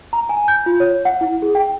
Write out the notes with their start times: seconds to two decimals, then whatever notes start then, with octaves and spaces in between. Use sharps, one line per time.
0.13 A#5
0.29 G#5
0.48 G6
0.66 F4
0.80 C#5
1.05 F#5
1.21 E4
1.42 G#4
1.55 G5